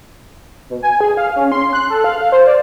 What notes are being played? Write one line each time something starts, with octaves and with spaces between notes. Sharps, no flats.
B2
G#5
G#4
F5
C#4
C6
F#6
A4
F5
F5
C5
D5